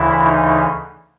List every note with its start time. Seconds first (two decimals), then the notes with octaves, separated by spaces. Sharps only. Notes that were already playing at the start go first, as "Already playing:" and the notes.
Already playing: D2 C#3 E3 E4
0.24 D#4